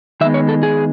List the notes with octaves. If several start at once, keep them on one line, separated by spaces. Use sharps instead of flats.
D#3 G#3 B3 E5
C#5
A4
G#4